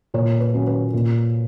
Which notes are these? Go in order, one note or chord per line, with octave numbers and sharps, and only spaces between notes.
A#2 C#5
B4
F#3 C#4
B4
A#2